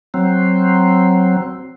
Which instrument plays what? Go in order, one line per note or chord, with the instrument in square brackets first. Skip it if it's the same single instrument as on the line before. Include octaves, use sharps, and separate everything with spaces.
[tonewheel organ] F#3 C4